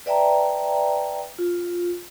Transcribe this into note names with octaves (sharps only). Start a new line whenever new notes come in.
B4 D5 E5 G5 A5 A#5
F4